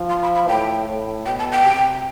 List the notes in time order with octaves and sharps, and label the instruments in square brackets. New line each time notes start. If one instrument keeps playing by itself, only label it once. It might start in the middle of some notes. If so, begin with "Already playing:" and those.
Already playing: [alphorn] F3
[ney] C6
B5
B5
[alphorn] A2 [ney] G5
[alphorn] A2
[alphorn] B2 [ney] G5
[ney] A5
G5
[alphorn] C3